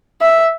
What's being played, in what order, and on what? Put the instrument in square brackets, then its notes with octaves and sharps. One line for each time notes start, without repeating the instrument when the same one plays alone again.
[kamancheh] E5